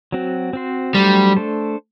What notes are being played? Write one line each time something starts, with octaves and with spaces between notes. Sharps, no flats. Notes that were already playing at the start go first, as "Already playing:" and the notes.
F#3 C4 F#4
C4 F#4 C5
F#3 G3 A3 D4 G4 C5
A3 D4 A4 C5